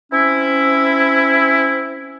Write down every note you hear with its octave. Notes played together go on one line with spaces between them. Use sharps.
C4 C#4 E4